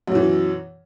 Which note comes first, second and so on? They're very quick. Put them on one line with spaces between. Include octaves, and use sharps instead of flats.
F#2 B2 E3